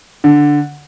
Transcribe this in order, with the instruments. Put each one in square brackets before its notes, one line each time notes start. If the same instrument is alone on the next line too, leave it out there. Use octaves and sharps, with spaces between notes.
[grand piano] D3